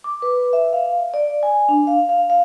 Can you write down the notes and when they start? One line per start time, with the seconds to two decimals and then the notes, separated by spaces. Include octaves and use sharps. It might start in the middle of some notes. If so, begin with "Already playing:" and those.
0.04 D6
0.22 B4
0.53 E5
0.73 F5
1.14 D5
1.43 G#5
1.69 D4
1.87 F5
2.09 F5
2.30 F5